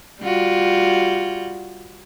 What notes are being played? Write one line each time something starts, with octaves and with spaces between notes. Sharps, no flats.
G3 F4 F#4